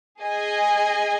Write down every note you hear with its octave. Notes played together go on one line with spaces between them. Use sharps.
G#4 D#5 G#5